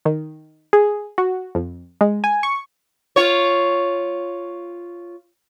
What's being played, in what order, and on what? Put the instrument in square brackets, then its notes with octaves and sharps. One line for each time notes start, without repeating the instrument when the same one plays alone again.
[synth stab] D#3
G#4
F#4
F2
G#3
G#5
C#6
[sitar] F4 C#5